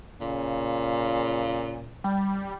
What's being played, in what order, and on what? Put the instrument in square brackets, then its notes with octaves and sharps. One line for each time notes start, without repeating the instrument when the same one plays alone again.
[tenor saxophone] A#2 [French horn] C#3
[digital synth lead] G3